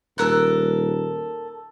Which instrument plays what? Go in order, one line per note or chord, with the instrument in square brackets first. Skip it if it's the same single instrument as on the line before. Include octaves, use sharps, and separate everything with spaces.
[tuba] D#1 [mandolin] A4 A#4 F#6